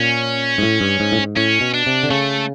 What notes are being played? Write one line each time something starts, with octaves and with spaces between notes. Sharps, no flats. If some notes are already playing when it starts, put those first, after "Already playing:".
Already playing: A#2 C#4
G#2
A2
G2
G#2
A2
G#2
A2 C#4
B2
D4
C3
D3
C#3 A3